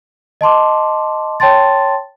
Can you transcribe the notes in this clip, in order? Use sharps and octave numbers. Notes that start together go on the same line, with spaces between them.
D#5 A5 C6 D6
C#5 G5 A5 C6 A6